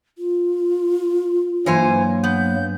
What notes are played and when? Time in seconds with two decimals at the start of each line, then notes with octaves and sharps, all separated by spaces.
0.18 F4
1.66 G2 E3 F#3 A#3 C5 C#5 G#5
2.24 B3 G6